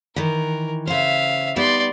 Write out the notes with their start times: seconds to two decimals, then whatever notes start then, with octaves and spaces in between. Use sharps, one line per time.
0.16 D#3 E3 A#4
0.87 C#3 C5 E5 F5
1.56 G3 B3 D#4 D5 C6